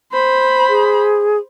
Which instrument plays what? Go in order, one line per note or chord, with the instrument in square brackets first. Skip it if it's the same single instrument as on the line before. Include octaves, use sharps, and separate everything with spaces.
[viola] C5 B5
[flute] G#4